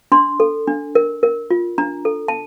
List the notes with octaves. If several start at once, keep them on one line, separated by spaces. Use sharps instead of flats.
D4 C6
A4
D4
A#4
A#4
F4
D4 A#5
A4
A5